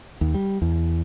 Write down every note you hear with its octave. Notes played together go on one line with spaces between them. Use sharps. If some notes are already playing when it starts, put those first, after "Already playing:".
D#2
G3
E2